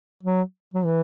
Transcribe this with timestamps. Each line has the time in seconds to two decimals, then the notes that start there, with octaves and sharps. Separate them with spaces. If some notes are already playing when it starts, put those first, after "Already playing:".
0.23 F#3
0.74 F#3
0.85 E3